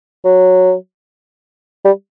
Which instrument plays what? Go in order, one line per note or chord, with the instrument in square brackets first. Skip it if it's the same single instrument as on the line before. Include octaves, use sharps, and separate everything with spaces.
[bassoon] F#3
G3